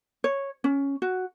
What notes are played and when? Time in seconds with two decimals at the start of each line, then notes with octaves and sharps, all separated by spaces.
0.24 C#5
0.64 C#4
1.02 F#4